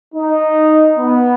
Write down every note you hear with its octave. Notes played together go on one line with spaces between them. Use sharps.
D#4
B3